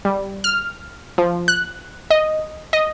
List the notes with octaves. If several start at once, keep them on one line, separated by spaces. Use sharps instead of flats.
G3
F6
F3
F#6
D#5
D#5